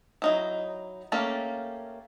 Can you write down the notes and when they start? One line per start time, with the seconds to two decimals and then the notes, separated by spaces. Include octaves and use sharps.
0.22 F#3 D#4 E4
1.12 A3 A#3 C#4 G4 A4